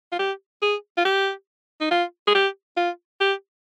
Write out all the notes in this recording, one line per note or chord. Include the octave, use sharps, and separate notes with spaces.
F4
G4
G#4
F4
G4
D#4
F4
G#4
G4
F4
G4